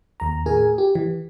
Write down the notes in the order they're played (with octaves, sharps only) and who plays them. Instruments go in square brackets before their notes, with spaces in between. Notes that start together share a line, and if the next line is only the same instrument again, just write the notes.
[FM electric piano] D#2 A#5
A2 G#4 A#4 G#5
G4
E3